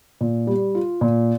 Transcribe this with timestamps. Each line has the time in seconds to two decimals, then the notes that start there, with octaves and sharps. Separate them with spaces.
0.21 A#2
0.47 G3
0.75 F4
1.01 A#2